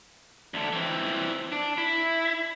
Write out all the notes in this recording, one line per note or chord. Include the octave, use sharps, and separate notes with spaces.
D2 D3
E3 C4
D4
E4